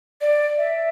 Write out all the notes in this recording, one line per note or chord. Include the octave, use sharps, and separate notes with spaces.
D5
E5